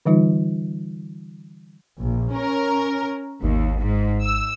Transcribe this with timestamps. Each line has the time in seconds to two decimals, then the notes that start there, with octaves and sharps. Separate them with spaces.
0.06 D3 E3 G3 D#4 F4
2.00 A#1
2.34 C#4 A#4
3.43 G#1 D#2
3.81 G#2
4.24 E6